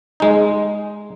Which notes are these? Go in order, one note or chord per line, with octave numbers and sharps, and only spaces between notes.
G#3 D#4